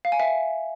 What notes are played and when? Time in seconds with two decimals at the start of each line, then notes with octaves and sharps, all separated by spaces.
0.05 F5
0.12 G#5
0.20 E5